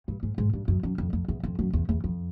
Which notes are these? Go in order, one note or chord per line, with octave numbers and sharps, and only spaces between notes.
G2
G#2
G#2
G2
F#2
F#2
F2
F2
E2
F2
F#2
E2
E2
F2